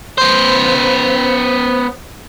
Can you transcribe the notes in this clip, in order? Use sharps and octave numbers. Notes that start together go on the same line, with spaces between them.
B3 C5